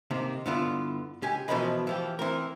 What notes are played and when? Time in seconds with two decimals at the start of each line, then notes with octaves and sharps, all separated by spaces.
0.11 C3 D#3 A#3
0.46 G2 D3 B3 E4 F4
1.22 C#2 G4 G#5
1.48 B2 E3 F3 A#4 B4 D#5
1.87 E3 F3 G4
2.19 E3 C4 A#4